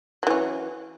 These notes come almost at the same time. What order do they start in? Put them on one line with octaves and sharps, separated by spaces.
F#3 E3 C#4